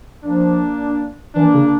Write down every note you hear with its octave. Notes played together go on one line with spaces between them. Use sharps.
F3 A#3 D4
E3 A#3 D4
C#3